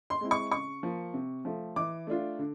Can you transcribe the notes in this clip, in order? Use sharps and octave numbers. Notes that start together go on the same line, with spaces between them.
C6
G#3 C4 E4
C#6
C#3 C#6
F3 A#3
C3
F3 A3
E3 D6
A3 D4 F4
D3